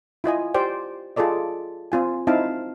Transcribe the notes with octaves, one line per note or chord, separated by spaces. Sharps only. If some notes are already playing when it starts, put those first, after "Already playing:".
E4 F4 D#5 G#5
G4 C5 D5 G5
F4 G#4 A4 D5 D#5
C4 F4 G#5
C4 D#4 E4 F5 A5